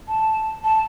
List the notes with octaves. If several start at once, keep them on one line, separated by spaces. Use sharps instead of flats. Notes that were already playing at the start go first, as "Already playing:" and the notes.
A5
A5